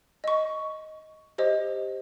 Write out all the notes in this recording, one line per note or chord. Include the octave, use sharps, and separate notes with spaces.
D#5 C#6
G4 C5 D#5